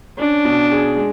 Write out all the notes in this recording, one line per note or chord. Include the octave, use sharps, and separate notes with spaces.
C#4 D4
B2
G#4
G#3